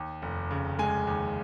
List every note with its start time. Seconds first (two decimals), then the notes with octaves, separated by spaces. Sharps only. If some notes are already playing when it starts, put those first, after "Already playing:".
Already playing: D#2
0.22 F1
0.51 C#3
0.79 G#3 G#5
1.07 D#2